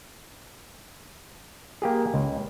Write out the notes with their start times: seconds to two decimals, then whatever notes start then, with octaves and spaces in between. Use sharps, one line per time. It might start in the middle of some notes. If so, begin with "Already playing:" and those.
1.82 A#3 G4 G#4
2.14 C#2